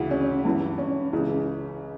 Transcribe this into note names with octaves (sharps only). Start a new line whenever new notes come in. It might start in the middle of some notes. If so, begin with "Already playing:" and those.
Already playing: D2 C#3 E3
C#4
G2 E3
C#4
C#2 C#3 E3